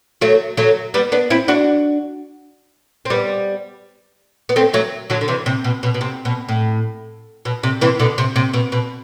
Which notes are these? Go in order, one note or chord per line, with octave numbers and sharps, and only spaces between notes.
F#3 A3
F#3 A3
G3 B3
B3 D4
C4 E4
D4 F#4
C4
G3 B3
B3
A3 C4
F#3 A3
D3 F#3
D3
C3 E3
C3
B2
B2
B2
C3
B2
A2
B2
C3
C3 E3
B2 D3
C3
C3
B2
B2